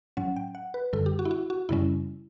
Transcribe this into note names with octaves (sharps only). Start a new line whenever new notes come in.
A2 F#3 C#4 F#5
G5
F#5
B4
F#2 D3 G3 A4
G4
F#4
E4
F#4
F#4
F#2 C#3 G3 C#4 E4